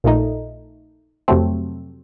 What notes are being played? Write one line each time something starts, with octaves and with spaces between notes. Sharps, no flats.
A#1 A#2 A3 D#4
F2 C3 F#3 A3 C4